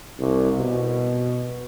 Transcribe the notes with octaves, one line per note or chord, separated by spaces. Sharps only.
C2
B2